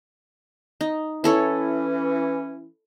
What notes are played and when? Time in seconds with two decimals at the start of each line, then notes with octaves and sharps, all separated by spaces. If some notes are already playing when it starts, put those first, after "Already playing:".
0.81 D#4
1.24 E3 C#4 E4 A4 C#5